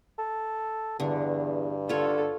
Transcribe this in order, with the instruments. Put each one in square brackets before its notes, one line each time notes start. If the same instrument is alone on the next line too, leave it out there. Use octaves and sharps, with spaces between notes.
[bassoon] A4
[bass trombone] E2 [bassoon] G2 [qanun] D3
[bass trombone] D3 [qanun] F4 C#5 [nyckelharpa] A4